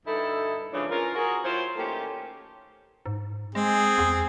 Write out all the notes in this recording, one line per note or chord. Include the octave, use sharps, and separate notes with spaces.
D2 G2 D#4 E4 A4
D2 G#2 C#3 E3 F3 D4
E3 C#4 F4 A#4
F#4 G#4 A#4
F#3 E4 F4 C5
D#3 A3 A#3 C#4 G4 A#4
G#2
G#3 C4 G#4
E2